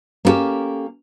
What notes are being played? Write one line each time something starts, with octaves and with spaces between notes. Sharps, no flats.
A#3 B3 C#4 G4 A4